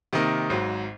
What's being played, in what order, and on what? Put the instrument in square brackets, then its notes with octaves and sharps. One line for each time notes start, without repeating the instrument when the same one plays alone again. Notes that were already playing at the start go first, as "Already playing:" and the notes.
[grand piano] C3 D#3 A#3 D#4 A#4
G#1 G#2 F#3